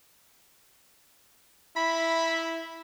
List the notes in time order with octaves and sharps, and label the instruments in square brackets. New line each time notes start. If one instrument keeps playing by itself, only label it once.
[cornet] E4 [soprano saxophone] B5